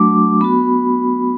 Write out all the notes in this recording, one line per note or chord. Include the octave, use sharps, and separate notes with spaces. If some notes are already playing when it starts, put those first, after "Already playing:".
Already playing: F#3 A3 D4 F#4 D6
B3 F#4 B5